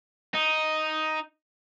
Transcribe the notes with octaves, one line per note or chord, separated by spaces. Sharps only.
D#4